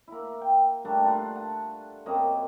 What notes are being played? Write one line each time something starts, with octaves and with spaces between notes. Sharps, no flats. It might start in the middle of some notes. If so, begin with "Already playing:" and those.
A#3 E4
G5
G3 A3 A#3 D4
D4 F4 B4 F#5
F#5 A5
F#2 A#3 C4 D#5